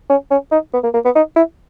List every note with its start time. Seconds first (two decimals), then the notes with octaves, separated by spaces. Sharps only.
0.10 C#4
0.31 C#4
0.52 D#4
0.74 B3
0.84 A#3
0.94 A#3
1.05 B3
1.16 D#4
1.36 E4